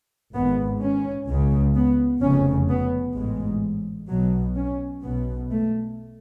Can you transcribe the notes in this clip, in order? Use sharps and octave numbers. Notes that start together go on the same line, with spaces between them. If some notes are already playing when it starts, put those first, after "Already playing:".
G#1 G#2 B3
C#4
C#2 C#3
B3
F1 F2 C#3 C#4
B3
A1 G#2 G#3
B1 B2 F#3
C#4
B1 B2 B3
A3